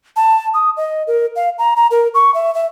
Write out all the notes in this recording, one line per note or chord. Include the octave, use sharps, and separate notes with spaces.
A5
D#6
D#5
A#4
F5
A#5
A#5
A#4
C#6
E5
E5